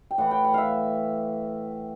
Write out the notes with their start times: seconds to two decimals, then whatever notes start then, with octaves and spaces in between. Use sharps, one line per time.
0.11 G5
0.18 A2 E3 F#5
0.31 G5
0.45 F#5
0.54 E5 F5